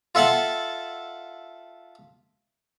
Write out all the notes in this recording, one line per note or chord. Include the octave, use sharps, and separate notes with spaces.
F4 A4 E5 F#5 A5